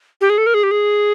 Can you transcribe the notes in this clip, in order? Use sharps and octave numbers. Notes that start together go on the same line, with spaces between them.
G4
G#4
A4
A#4
G#4
G4
G#4